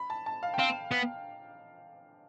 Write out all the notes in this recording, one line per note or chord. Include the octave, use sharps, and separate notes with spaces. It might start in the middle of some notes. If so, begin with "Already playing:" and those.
Already playing: B5
A5
A5
F5
G5
C4 F5
B3